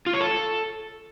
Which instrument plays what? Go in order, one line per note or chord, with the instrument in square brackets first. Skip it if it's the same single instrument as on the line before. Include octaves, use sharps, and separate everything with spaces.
[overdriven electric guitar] F4
C#5
A4